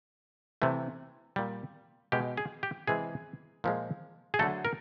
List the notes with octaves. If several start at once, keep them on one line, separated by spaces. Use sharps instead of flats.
C3 E3 A3
A#2 G3
B2 G#3 G4
G#4
G4
C3 E3 G#3 G#4
A#2 F3 G#3
G#4
D3 F#3 A3 A4
A#4